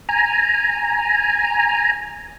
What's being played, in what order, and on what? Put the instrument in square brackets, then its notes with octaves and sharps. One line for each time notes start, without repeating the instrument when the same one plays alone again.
[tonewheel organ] G#5 A#5